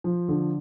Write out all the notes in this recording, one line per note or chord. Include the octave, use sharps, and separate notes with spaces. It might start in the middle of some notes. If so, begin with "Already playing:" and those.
F3
D3